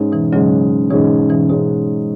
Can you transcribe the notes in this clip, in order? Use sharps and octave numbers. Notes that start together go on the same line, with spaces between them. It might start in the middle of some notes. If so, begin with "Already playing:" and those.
Already playing: G#2 G#3 C#4
B2 E3
G#2 C#3 F#3 G#3 C#4
G#2 B2 E3 G#3 C#4
B2 E3
G#2 B2 G#3 C#4